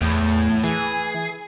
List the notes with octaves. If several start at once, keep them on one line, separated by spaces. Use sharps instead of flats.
E2 A2
E3 G#4